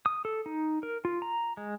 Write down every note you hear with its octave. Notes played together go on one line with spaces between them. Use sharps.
D#6
A4
D#4
A#4
F4
A#5
G#3